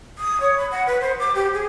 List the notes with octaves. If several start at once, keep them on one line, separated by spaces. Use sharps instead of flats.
D#6
C#5
B5
F#5
B4
C5
D6
G4
G#4